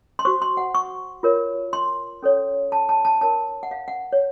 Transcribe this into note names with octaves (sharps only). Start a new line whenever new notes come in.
C6
F#4 C5 C#6
C6
F#5
C#6
F4 A#4 C#5
C6
C#4 A4 C#5
A5
A5
A5
D#4 A#4 C#5 A5
F#5
F5
F#5
C#5